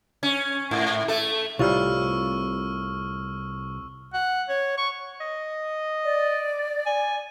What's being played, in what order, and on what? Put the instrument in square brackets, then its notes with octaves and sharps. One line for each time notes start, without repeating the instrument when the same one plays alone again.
[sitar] C#4
G#2
A3 A4
[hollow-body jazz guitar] C2 F4 [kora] A2 C3 G3 [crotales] C#6 E6 F6
[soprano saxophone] F#5
C#5
C#6
[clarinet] D#5
[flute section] D5
[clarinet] G#5